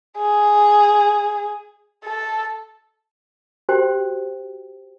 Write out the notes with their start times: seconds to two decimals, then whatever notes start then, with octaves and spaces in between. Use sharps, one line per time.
0.18 G#4
2.05 A4
3.69 F#4 G4 C5 G5